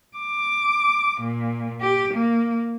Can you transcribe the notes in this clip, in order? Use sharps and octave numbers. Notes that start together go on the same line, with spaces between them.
D6
A#2
G4
A#3